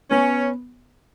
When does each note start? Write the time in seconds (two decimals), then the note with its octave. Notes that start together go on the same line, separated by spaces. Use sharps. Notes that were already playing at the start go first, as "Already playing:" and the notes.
0.11 B3 C#4